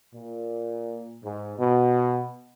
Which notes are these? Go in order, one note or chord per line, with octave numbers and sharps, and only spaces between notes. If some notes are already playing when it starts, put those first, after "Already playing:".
A#2
G#2
B2